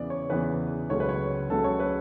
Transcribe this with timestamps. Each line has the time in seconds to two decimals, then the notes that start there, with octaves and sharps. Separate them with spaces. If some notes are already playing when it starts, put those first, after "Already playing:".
Already playing: E2 C#3 E3 B3 D5
0.10 C#5
0.29 E2 C#3 E3 B3 B4
0.90 C#2 C#3 F#3 A3 C#5
1.00 B4
1.09 C#5
1.50 C#2 C#3 F#3 A3 A4
1.64 C#5
1.80 B4